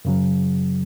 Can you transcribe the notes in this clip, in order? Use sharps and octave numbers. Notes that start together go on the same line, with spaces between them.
F#2 C#3 F#3